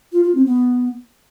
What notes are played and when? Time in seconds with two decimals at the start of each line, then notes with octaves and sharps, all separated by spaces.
0.12 F4
0.24 F4
0.35 C4
0.46 B3